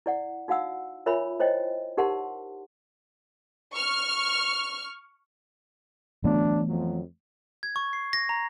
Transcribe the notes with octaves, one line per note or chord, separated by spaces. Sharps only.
E4 D5 F#5
D#4 F#4 F5 F#5 E6
F4 A#4 C#5 E5 G#5 B5
E4 C5 C#5 D#5 G5
D#4 G4 A#4 F#5 A5 C6
C#6 F6
D2 E3 F#3 A3 B3 D4
F2 F3 F#3
G#6
C#6
C7
A#6
A#5